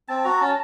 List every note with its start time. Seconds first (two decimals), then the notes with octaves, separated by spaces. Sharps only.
0.08 C4 A5
0.24 F#4 A#5
0.41 C#4 A5